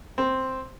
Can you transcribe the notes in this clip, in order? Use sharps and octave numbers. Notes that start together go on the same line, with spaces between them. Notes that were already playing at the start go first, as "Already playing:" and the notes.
C4